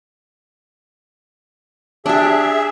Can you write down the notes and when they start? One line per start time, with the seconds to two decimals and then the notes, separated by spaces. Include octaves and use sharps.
2.06 D4 G4 G#4 E5